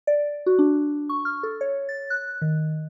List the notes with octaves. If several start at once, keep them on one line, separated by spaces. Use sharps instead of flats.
D5
F#4
D4
C#6
F6
A4
C#5
A6
F#6
D#3